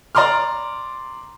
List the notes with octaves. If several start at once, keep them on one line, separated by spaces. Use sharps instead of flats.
D5 A#5 C6 D6 F6